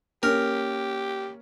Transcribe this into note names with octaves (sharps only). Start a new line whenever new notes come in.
A#3 C#4 G4 A#4